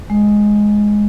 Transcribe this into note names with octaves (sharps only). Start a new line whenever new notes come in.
G#3